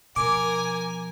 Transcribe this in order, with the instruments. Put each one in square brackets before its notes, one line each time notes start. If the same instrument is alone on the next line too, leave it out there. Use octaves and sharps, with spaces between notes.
[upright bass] B2 F3 [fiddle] A#4 [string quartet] G#5 [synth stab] D6